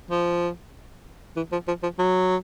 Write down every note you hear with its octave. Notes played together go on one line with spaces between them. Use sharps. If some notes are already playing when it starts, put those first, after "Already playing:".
F3
E3
F3
F3
F3
F#3